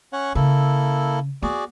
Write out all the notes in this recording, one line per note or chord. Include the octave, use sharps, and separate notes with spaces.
C#4 C#5 F#5
C#3 A#3 E4 A4
B3 F#4 G#4 D5